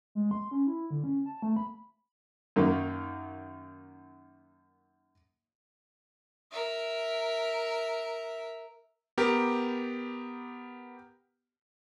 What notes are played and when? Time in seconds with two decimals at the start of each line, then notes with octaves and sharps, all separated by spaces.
0.15 G#3
0.31 C6
0.51 C#4
0.67 E4
0.90 D3
1.04 C#4
1.26 A5
1.42 A3
1.56 B5
2.56 F#2 D#3 A#3
6.51 A#4 E5
9.17 B3 G4 A#4